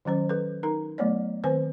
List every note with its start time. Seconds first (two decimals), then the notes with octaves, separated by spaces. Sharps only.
0.05 D#3 F#3 C#4 C5
0.29 A4 B4
0.63 D#4 A#4 A#5
0.98 F#3 A3 B3 C#5 D5
1.44 D#3 C4 B4 C5 G#5